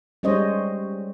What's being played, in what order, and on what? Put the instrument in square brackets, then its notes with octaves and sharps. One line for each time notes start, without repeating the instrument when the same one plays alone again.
[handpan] G3 G#3 C#4 C5 C#5 D#5